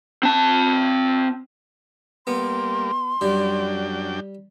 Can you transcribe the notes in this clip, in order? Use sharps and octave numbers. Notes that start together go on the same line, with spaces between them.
C4 A5
G3 A#3 B3 C6
F#2 G3 D4 G5